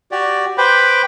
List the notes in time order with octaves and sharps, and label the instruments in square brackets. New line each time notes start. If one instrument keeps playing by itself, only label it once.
[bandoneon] F#4 G4 D5
B4 C5 G5 B5 D6